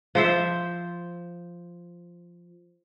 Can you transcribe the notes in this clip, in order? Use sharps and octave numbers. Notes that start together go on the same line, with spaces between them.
F3 C5 E5